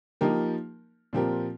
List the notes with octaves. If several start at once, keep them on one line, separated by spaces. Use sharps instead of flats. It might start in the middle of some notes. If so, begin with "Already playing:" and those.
F3 A#3 D#4 G4 A#4
A#2 F3 C4 G4 A#4